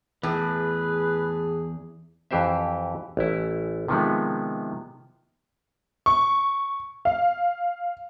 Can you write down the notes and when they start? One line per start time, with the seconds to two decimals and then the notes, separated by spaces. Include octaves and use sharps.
0.23 E2 A2 G#4 B4
2.31 F2 E3 G4 C5 E5
3.17 A1 E4
3.88 C3 D#3 F3 G#3 B3
6.06 C#6
7.05 F5